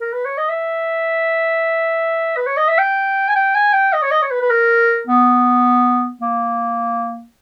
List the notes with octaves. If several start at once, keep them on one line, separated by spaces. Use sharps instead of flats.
A#4
B4
C#5
D#5
E5
B4
C#5
D#5
E5
G5
G#5
G5
G#5
G5
D#5
C#5
D#5
C#5
B4
B4
A#4
B3
A#3